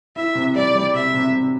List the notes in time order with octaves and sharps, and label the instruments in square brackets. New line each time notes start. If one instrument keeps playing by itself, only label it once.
[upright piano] E4 [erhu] E5
[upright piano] C3
[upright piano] G3 [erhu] D5
[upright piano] G3
[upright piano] C3 [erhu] E5
[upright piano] C3
C3